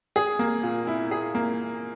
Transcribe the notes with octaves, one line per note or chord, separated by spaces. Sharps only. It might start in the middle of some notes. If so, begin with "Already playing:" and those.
G#4
A#3
A#2
E4
G#4
A#3